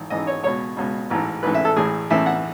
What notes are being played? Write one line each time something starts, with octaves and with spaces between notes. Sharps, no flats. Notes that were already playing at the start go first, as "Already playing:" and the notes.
Already playing: G#1 G#2 E3
G#1 G#2 E3 D#5
C#5
C#2 B2 C#5
C#2 B2
A1 G#2 E3
A1 G#2 E3 B4
E5
A4
A1 A2 E3 G#4
A1 A2 E3 E5
F#5